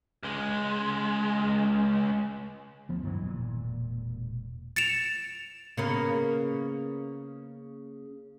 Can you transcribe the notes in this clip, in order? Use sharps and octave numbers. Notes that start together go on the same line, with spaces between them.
C#2 G#3
D2 F3 B3
G2 D#3 E3 F#3
E1 A#2
A6 C#7 D7 E7 F7
C#3 A#3 B3